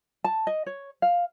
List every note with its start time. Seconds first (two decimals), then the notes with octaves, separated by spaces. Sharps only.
0.24 A5
0.47 D#5
0.66 C#5
1.02 F5